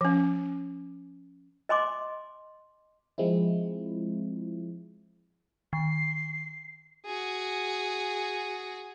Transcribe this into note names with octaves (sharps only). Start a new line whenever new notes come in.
F3 C#4
D#5 G#5 C6 D6
F3 G#3 C4 E4
D#3 C7
F#4 G#4